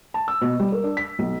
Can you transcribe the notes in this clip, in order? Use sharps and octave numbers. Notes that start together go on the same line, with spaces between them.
A5
E6
B2
G3
A#4
D4
B6
B1